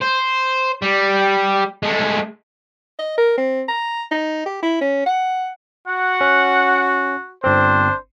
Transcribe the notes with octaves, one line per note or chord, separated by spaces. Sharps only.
C5
G3
G#3 A3
D#5
A#4
C4
A#5
D#4
G4
E4
C#4
F#5
F#4 F#5
C#4
G1 C4 D4 C5